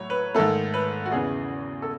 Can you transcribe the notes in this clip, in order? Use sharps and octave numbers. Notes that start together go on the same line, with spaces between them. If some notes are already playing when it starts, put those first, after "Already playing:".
Already playing: A2 F#3 A3 C#5
B4
G#2 D#3 A3 A4
B4
F#4
E2 C#3 E3 G#4
A4